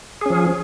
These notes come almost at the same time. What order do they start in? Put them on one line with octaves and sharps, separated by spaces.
G#4 C#4 F3